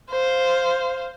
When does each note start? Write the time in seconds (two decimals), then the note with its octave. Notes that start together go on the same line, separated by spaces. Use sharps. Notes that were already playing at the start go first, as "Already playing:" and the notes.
0.11 C5 F5